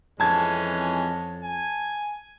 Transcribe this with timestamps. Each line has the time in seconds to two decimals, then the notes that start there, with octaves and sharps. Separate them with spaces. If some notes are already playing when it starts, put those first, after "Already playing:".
0.20 F2 E3 G#3 C#4 A5 G#6
1.43 G#5